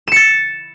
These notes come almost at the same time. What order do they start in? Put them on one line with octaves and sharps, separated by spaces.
E7 C#7 A6